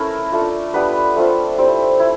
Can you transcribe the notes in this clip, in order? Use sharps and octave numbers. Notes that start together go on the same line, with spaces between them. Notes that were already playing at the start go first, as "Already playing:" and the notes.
Already playing: A3 C#4 E4 A#4
A3 D4 F4
G3 B3 D4 B4
A3 C4 F4
G3 C4 E4
E4